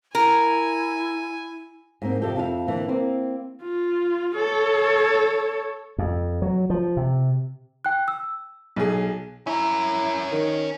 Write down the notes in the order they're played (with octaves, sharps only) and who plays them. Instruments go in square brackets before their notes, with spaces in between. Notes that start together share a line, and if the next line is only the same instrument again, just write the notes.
[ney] E4 [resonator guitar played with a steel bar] A#4 [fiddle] G#5
[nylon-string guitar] G#2 A#3 C4
F2 C3 G4 A4 G5
F2 E4 F5
D3 E3 A#3 C4
A#3 C4 E4
[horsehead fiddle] F4
A4 C#5
[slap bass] F2
F#3
F3
C3
[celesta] G5 F#6
E6
[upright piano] B1 G#4
[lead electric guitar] C#4 A#4 [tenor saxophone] E4
[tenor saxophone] D#3